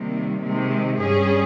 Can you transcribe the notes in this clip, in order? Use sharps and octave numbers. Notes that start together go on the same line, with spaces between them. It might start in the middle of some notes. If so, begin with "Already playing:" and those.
Already playing: C3 D#3 G3 A#3
C3 D#3 G#3
G2 G3 C#4 G#4